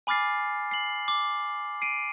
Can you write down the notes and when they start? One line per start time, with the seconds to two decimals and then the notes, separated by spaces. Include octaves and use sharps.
0.07 G#5 B5 D6 F6 A6 C7
0.71 C7 F#7
1.08 D6
1.82 C7 D7 D#7